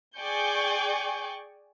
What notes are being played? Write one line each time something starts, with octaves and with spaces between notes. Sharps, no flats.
G#4 D5 G5 G#5 C#6 G6